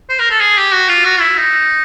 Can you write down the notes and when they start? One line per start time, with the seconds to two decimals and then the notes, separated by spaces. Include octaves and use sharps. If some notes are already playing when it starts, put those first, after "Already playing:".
0.09 C5
0.19 A#4
0.30 A4
0.40 G#4
0.57 G4
0.72 F#4
0.88 F4
1.04 F#4
1.20 E4
1.36 D#4